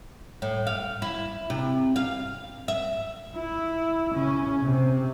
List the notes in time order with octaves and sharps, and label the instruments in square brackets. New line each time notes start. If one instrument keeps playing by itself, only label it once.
[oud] A2
F5
E4
C3
F5
E5
[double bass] E4
C#3 C#4
C3